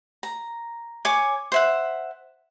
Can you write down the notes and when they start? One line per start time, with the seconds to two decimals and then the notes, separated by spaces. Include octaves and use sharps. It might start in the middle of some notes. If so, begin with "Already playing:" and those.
0.23 A#5
1.05 C#5 G#5 D6
1.52 C5 E5 F#5